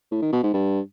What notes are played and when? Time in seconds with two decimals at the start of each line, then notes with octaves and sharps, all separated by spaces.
0.11 A2
0.22 D#3
0.32 B2
0.43 G#2
0.53 G2